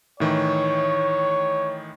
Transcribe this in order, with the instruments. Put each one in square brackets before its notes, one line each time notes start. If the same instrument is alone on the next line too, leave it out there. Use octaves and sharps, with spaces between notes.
[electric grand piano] A2 D#3 E3 [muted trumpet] C#5